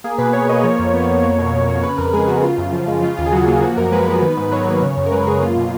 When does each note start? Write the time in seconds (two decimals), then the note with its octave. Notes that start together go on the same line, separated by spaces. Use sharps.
0.04 A#3 G#4
0.18 B2 B4
0.33 B2 C#5
0.49 A#3 D#5
0.64 F3 C#5
0.79 F2
0.94 B3
1.08 F2
1.23 A#3
1.38 B2
1.54 B2
1.68 A#3
1.83 C#3 B4
1.98 F2 A#4
2.13 G#3 G#4
2.28 B3 F#4
2.43 C#3 F4
2.58 F#2
2.73 F3
2.87 G#3
3.02 C#3 F4
3.17 D#2 F4
3.26 G#4
3.32 F#3 F#4
3.47 A#3 F4
3.63 F3 F#4
3.77 F#2 A#4
3.92 G#3 B4
4.07 B3
4.22 D#3
4.37 G#2
4.52 F#3 C#5
4.67 A#3
4.83 C#3
4.97 F#2
5.06 A#4
5.12 G#3 B4
5.26 F#2 G#4
5.42 A#3 F4
5.57 B2